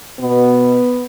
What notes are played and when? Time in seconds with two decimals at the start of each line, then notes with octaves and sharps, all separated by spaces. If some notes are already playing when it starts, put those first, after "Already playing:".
0.20 B2 B3